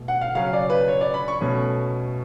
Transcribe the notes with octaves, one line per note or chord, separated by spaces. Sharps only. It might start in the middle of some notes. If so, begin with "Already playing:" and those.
Already playing: B2 A3
F#5
F5
C#3 F#3 C#4 F5
D5
B4
C#5
D5
B5
C#6
B2 A3 C#4